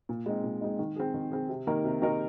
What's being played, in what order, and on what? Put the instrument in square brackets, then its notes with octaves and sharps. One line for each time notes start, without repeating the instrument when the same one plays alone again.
[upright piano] A#2
G#3 C4 D#4
A#2
G#3 C4 D#4
D#3
C4 G#4
D#3
C4 G#4
C3
D#3 A#3 D#4 A#4
C3
D#3 A#3 D#4 A#4